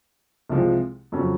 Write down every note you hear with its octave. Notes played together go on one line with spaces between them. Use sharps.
C2 C3 F3 G#3
F2 C#3 F#3 C#4